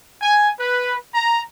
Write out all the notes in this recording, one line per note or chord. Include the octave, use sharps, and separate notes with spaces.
G#5
B4
A#5